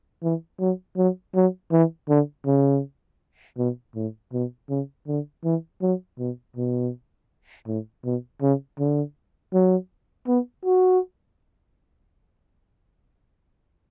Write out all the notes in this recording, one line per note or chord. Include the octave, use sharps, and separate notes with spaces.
E3
F#3
F#3
F#3
E3
D3
C#3
B2
A2
B2
C#3
D3
E3
F#3
B2
B2
A2
B2
C#3
D3
F#3
B3
F#4